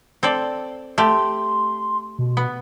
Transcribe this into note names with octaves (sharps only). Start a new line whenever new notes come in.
C4 A4 D5
A3 G4 C6
B2
B3